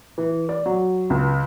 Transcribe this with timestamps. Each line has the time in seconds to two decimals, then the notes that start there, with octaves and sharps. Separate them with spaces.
0.18 E3
0.49 D5
0.66 F#3
1.10 C#2